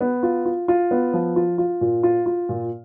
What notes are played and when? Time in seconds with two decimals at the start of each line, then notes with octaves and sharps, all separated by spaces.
0.01 B3
0.23 F4
0.45 F4
0.68 F4
0.91 B3
1.13 F3
1.36 F4
1.58 F4
1.81 A#2
2.03 F4
2.26 F4
2.49 A#2